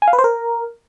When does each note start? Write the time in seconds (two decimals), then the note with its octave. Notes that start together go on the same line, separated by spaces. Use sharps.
0.02 G#5
0.08 F5
0.13 B4
0.19 C5
0.24 A#4